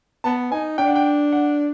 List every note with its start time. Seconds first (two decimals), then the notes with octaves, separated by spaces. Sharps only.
0.24 B3 A5
0.52 D#4 G#5
0.78 D4 G5
0.88 F#5
0.95 G5
1.33 F#5